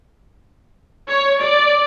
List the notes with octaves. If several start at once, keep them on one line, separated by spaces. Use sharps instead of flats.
C#5
D5